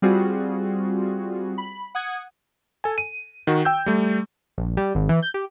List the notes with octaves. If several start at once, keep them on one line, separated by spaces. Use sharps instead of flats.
G3 C4 F4 F#4 G#4
B5
F#5 D#6 G#6
A4 G#5
D#7
D#3 F#4
G5 E6 G6
G3 A3
A#1
G3
G#1
E3
G6
G4